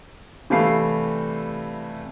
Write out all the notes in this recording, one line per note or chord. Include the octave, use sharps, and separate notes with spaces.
C3 E3 G3 A3 F5 C7